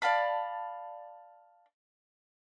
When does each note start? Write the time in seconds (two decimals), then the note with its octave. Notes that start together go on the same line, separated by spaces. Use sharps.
0.02 D5 F5 A5 B5